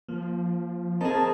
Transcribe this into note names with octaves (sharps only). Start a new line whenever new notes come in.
F3 A#3
C4 D#4 G#4 A#4 A5